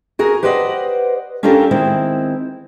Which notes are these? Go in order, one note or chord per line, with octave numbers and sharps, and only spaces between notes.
F#4 G#4 A#4
G4 B4 C5 D5 D#5 F#5
C#4 D4 F4 G4 A4 A#4
D#3 G#3 C4 E4